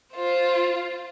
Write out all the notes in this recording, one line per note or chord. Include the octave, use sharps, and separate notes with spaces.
F4 C5